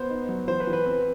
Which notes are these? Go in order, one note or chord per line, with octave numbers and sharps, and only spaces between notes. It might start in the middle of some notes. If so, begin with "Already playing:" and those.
Already playing: B3 C5
D#4
F#3
E3 C5
B4
E3
B4
C4